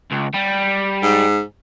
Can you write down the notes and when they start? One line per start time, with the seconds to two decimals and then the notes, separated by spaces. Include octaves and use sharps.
0.12 C#2
0.34 G3
1.03 G#2